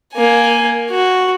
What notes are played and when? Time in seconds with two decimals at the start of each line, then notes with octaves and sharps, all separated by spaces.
0.14 A#3 G#5
0.90 F#4